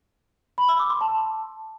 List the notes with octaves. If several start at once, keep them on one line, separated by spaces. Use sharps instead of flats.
B5
E6
D6
C6
A5